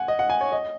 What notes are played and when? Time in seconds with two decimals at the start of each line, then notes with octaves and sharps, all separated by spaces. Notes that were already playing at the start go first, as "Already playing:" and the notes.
Already playing: F#5 G#5
0.08 D#5
0.19 F#5
0.30 G#5
0.41 C#5
0.52 D#5